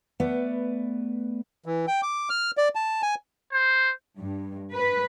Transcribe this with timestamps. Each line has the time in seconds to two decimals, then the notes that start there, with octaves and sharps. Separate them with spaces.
0.20 A3 B3 B4 D5
1.66 E3
1.87 G5
2.02 D6
2.30 F6
2.57 D5
2.75 A5
3.02 G#5
3.52 C5
4.20 G2
4.73 B4